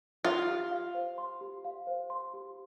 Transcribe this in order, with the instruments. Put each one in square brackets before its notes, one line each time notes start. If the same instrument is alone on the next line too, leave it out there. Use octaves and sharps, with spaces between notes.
[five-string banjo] F4 [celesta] C6
[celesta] G4
F5
C5
C6
G4
F5
C5
C6
G4